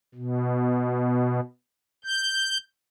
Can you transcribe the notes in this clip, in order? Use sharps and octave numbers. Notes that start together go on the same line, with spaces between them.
B2
G6